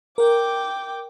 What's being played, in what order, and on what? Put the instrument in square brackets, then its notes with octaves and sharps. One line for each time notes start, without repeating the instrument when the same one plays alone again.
[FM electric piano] A#4 [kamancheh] G5 D6